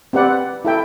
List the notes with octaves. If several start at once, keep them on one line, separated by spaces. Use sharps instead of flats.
C4 G4 B4 D5 F#5
E4 A4 E5 G5